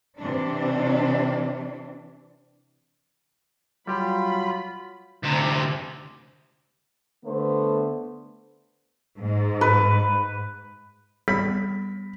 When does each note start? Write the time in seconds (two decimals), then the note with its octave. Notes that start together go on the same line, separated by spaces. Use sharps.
0.18 C3 E3 D4
3.87 F#3 G3 F4 G4 B5
5.24 D2 C3
7.24 D3 A3 B3 C5
9.20 G#2
9.61 B4
11.28 G3 B3 B5 B6